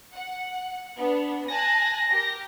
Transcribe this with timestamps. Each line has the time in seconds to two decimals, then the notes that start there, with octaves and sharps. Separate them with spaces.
0.14 F#5
0.98 B3 D4
1.48 G#5 A5 F#6 A#6
2.10 G4 A#4